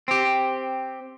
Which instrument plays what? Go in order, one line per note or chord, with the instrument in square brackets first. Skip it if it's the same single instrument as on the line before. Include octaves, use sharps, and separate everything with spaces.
[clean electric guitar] C4 G4